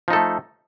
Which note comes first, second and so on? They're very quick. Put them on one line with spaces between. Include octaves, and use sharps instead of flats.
F3 D#4 A4 A3